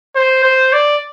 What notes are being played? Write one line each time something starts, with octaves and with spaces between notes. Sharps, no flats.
C5
C5
D5